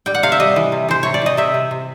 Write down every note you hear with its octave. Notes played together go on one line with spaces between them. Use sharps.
G3 G5
F#5
C3 F5
E5
G3 D#5
E3
C3
E3 C5
C3 C#5
D5
E3 D#5
C3 E5
C3
C3